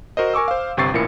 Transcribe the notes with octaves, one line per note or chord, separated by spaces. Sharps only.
F#4 A#4 C5 D#5
A#4 G#5 C#6 D6 E6
C5 F5
G1 C3 C4 C#6 A6 C7
A1 A#2 E4 A#4 C#7